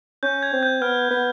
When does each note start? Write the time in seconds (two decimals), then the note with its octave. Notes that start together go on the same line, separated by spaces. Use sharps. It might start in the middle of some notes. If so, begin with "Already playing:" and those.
0.23 C#4 G6
0.43 G#6
0.53 C4
0.63 G6
0.81 B3 F6
1.11 B3